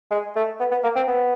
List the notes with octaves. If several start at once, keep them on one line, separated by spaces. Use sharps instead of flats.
G#3
A3
B3
B3
A#3
C4
B3